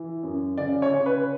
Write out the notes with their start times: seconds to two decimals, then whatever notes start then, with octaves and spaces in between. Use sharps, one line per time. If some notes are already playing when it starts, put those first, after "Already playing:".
Already playing: E3
0.23 F#2
0.58 C#3 D5
0.82 C#5
0.93 C#3
1.06 B4